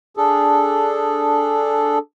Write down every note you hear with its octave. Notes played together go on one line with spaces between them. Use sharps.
D4 G#4 A4